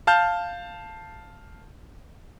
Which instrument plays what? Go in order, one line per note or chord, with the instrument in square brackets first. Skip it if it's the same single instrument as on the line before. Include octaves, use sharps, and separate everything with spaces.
[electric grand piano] F5 A5 F6 G6